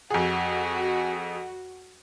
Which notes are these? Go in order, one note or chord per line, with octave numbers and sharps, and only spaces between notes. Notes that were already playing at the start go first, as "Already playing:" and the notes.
F2 F#4 G#4